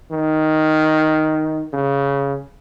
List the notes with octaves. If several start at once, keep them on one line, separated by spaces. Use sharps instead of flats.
D#3
C#3